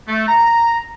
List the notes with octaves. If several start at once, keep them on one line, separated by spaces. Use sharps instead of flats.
A3
A#5